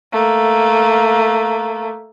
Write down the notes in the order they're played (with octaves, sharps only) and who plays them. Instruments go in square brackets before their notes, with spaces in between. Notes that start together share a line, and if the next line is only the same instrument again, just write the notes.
[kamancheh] A3 A#3